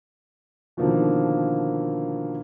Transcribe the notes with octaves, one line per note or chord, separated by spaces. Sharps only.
B2 D3 D#3 F3 A#3